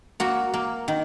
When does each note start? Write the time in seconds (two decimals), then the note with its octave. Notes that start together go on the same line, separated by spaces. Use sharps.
0.20 A#3 F#4
0.54 A#3
0.88 D#3